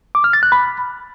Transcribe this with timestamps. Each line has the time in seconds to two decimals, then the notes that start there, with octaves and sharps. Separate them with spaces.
0.15 D6
0.24 F6
0.33 A6
0.43 F#6
0.52 B5